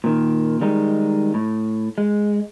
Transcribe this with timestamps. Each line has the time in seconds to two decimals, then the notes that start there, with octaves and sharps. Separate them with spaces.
0.04 A#2 D#3
0.61 D#3 G3 G#3 D#4
1.34 A2
1.98 G#3